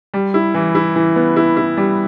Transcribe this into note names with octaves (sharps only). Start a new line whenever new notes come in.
G3
E4
E3
E4
E3
B3
E4
E4
G3